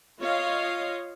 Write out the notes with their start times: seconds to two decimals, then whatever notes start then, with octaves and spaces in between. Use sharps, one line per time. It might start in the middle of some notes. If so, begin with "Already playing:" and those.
0.20 F4 C#5 D#5 F5